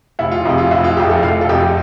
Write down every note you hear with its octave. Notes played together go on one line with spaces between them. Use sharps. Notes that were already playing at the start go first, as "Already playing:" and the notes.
F1 E4
F4
F2 C3 E4
F4
F1 E4
F4
F2 C3 G4
A4
F1 F5
A4
F2 C3 G4